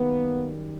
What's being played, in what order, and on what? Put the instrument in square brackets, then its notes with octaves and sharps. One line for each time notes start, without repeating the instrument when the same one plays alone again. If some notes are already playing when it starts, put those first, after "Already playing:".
Already playing: [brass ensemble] F#2 D#3 G3 A#3 B3